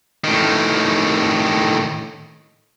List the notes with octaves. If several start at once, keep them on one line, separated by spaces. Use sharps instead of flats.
A2 D#3